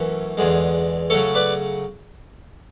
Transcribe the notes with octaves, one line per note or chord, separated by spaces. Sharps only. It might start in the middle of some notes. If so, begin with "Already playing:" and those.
Already playing: F#2 E3 A3 C#4
E2 D3 G#3
C#3 F#3 A3 A4 C#5
B4 D5